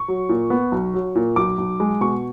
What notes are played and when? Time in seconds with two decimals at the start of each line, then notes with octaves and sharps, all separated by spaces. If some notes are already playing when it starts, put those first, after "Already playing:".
Already playing: C#6
0.08 F#3
0.29 A#2
0.50 B3
0.72 B1
0.94 F#3
1.15 A#2
1.36 B1 D6
1.58 B1
1.80 G#3
2.01 B2 C#6